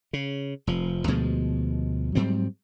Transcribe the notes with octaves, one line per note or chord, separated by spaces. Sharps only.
C#3
F1 F3
D2 B2 F3 G#3
G#2 F#3 G3 C4